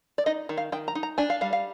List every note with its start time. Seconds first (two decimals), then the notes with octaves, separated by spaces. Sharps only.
0.18 D5
0.26 D#4 D#5
0.49 D#3
0.57 F5
0.72 D#3 G5
0.88 A#5
0.95 D#4
1.03 A#5
1.18 D4 G#5
1.30 F5
1.41 G3 F5
1.53 F5